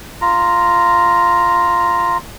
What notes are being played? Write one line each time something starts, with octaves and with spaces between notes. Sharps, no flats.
F4 A#5